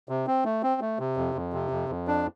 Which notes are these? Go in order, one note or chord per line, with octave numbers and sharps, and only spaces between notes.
C3
C4
A3
C4
A3
C3
F2
F2
C3
F2
F2
D4